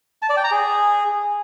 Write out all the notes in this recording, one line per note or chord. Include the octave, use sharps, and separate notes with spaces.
A5
D5
G5
A#5
G#4